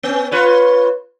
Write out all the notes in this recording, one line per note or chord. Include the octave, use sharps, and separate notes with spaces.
B3 C#4
F4 B4 C#5